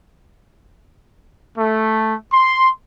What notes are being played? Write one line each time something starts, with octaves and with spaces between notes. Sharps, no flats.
A3
C6